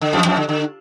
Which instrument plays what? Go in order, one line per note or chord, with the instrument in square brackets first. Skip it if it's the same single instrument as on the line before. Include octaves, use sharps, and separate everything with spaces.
[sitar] D3
F2 F3
F2 F3
D3
D3